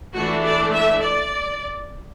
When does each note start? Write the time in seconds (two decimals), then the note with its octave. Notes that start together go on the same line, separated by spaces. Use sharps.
0.15 E3 A3 D4 F#4
0.44 D5
0.73 E5
1.01 D5